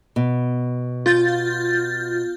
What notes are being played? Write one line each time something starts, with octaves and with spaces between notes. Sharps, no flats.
B2
F4 G6 A6